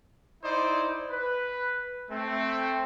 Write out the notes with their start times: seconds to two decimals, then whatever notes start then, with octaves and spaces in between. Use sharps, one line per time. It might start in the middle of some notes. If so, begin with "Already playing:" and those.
0.44 D#4 E4 C5 D5
1.10 B4
2.11 A3 C4